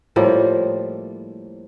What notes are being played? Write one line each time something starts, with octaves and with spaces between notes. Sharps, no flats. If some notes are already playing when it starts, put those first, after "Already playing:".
A2 F3 G3 A#3